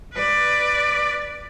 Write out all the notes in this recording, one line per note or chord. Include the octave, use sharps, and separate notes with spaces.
B4 D5